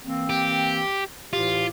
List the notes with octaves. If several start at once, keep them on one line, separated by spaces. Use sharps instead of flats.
E3 A#3 C4
G4
A2 E3 F4 G4